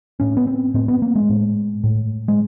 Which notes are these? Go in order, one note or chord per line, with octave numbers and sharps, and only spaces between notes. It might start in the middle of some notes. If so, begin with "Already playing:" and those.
A2 C#4
B3
C4
A2 C4
B3
A#3
G#3
A2
A2
G#3